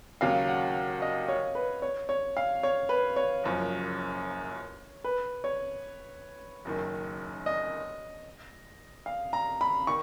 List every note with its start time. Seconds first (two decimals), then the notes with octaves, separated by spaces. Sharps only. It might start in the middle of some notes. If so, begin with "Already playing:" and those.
0.21 D#2 C#3 F#3 F5
0.48 F#5
1.02 D#5
1.28 C#5
1.55 B4
1.82 C#5
2.09 C#5
2.37 F5
2.63 C#5
2.89 B4
3.16 C#5
3.44 F#1 F#2 F3
5.04 B4
5.44 C#5
6.65 F#1 F#2 D#3
7.46 D#5
9.06 F5
9.33 A#5
9.61 B5
9.87 D#3 C#6